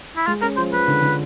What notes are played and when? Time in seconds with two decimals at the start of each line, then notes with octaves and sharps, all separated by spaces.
0.17 E4
0.27 G#3 F4
0.42 C#4 A#4
0.57 F3 C5
0.73 F3 B4
0.88 D3
1.02 D3